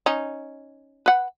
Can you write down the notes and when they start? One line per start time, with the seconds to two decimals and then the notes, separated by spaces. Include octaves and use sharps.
0.06 C#4 D#4
1.06 B4 F#5